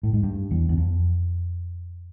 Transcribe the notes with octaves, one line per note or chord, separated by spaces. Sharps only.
A2
G#2
G2
E2
E2
F2